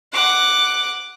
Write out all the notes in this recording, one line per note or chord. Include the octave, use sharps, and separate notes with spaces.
F#5 D6